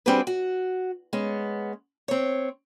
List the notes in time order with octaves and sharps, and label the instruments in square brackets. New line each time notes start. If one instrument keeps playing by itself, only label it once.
[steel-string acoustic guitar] G3 C4 D4 F#4 G#4 B4
F#4
G#3 B3 C#4
C4 C#5